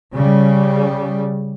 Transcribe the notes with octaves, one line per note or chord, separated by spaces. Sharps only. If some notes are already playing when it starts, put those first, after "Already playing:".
C#3 G3